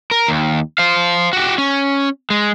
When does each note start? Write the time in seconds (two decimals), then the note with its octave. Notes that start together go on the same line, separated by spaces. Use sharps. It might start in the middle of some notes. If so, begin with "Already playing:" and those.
0.11 A#4
0.28 D#2
0.78 C5 F5
1.33 F#4 G4
1.58 C#4
2.30 G#3